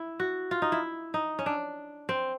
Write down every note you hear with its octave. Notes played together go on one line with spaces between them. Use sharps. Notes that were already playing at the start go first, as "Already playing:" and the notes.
Already playing: E4
F#4
F4
D#4
E4
D#4
C#4
D4
C4